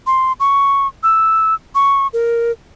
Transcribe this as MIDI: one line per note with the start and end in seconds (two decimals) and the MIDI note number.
0.07 0.33 84
0.40 0.87 85
1.03 1.55 88
1.75 2.07 85
2.13 2.52 70